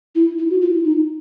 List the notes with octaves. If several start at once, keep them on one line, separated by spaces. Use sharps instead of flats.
E4
E4
F#4
F4
E4
D#4